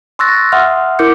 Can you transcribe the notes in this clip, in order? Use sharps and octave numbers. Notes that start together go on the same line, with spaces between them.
C6 C#6 E6 F#6 A6 A#6
E5 F#5 C6 D#6 F6
E4 A#4 D6 G6 C#7